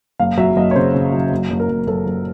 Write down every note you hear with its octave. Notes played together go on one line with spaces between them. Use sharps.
F#1 F5
F#3 E5
F#1 D#5
C#5
C#3 C5
C#3
F#3
F#1
F#1
A#4
F#1
F#1 A4
F#1